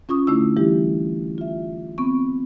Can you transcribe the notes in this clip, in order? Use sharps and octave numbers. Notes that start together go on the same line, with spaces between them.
C#4 F4 C#6 D#6
D3 A3 D4 E4 E6
E3 G3 E4 G4
F4 E5
B3 C4 C#6